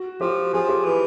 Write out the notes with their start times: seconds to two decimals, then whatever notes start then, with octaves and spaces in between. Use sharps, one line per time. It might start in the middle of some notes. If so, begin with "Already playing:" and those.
Already playing: F#4
0.21 F3 G4
0.53 F3 G#4
0.69 G4
0.85 E3